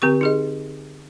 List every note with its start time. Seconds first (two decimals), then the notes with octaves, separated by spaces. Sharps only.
0.02 D3 C4 G4 C#6
0.21 D#4 G#4 D#5